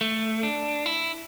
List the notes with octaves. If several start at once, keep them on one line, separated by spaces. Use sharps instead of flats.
A3
D4
E4